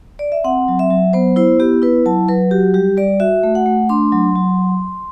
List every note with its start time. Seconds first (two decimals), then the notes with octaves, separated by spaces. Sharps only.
0.19 D5
0.32 E5
0.44 C4 F#5
0.68 F#3
0.79 E5
0.90 F#3
1.13 B3 C5
1.36 E4 C5
1.60 B3 G4
1.82 E4 B4
2.05 F#3 A5
2.29 F#3 B4
2.51 F#4 G4
2.74 G3 G4
2.97 G3 D5
3.20 F#4 E5
3.43 A3
3.55 F#5
3.66 A3
3.89 D4 C6
4.12 F#3
4.35 F#3